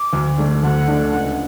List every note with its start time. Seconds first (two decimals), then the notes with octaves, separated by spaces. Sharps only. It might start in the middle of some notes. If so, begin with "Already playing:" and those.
Already playing: D6
0.13 D2
0.38 D3 A3 D4
0.63 D2 F#5
0.88 D3 A3 D4
1.12 C#2